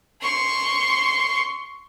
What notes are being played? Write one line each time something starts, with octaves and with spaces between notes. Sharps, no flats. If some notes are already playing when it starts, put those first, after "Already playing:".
C6 C#6